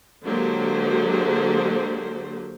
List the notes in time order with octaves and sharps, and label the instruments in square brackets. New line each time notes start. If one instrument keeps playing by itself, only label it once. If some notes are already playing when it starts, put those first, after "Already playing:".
[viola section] D3 F#3 G#3 A#3 G4 C5